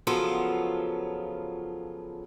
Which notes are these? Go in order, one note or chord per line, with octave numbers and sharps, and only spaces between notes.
C#3 F3 F#3 B3 F4 A4